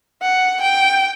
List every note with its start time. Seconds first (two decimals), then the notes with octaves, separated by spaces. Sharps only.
0.22 F#5
0.61 G5